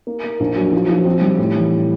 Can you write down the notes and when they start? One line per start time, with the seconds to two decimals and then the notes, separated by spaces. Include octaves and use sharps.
0.07 A#3
0.24 A#3
0.40 A#1
0.56 F#3
0.73 F3
0.89 F3
1.05 C4
1.21 G3
1.38 A2
1.55 E3